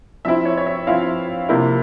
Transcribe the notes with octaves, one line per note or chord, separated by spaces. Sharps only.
F3 C4 E4 E5
C#5
C#5
E5
F3 C4 E4 F5
C3 F3 A#3 E4